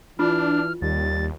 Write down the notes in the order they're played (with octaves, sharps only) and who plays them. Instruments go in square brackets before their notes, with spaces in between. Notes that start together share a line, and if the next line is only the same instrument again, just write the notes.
[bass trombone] E3 [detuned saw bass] D4 [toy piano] F4 [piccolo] F6
[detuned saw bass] D#2 [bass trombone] G3 [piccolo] A6